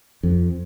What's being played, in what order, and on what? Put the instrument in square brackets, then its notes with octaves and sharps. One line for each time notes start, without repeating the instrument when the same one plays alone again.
[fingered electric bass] F2